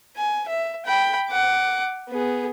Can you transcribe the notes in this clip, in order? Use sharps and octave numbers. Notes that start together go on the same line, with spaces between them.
G#5
E5
G5 B5
F#5 D6
B3 G#4